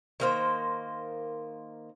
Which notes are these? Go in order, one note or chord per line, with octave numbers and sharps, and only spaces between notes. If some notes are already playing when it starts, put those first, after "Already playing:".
D#3 A#3 C5